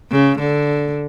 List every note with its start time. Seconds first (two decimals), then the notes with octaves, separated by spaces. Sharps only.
0.11 C#3
0.39 D3